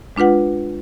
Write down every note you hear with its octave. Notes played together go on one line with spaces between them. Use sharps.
G#3 D4 F4 B4 F#5